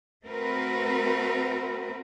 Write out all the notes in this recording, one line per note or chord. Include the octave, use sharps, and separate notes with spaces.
A3 C4 F#4 A#4 B4